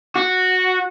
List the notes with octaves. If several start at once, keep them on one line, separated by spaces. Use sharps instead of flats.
F#4